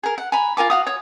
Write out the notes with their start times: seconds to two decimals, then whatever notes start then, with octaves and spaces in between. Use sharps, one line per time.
0.03 G#4 A#4
0.18 F#5
0.32 G#5 A#5 B5
0.57 F4 A#4 G#5 D6
0.70 F#4 F5 D#6
0.86 C#5 D#6